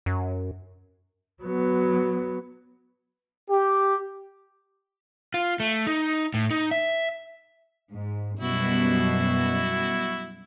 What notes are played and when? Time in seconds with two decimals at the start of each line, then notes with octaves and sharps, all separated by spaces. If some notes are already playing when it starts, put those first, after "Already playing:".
0.06 F#2
1.43 F#3 B3
3.50 G4
5.34 F4
5.60 A3
5.87 D#4
6.34 A2
6.51 D#4
6.71 E5
7.91 G#2
8.39 F#2 B2 G3 E4 F#4